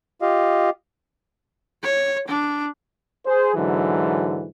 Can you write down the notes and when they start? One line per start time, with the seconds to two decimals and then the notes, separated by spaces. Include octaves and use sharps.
0.22 F4 G4 D#5 F5
1.83 C#5
2.28 D4
3.25 G#4 C5
3.55 G#2 D3 E3 F#3